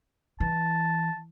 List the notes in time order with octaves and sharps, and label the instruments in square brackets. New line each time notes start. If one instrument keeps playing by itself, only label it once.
[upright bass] E3 [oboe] A5